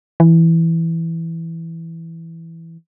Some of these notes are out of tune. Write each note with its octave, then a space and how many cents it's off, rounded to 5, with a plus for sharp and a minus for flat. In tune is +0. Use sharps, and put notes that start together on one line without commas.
E3 +0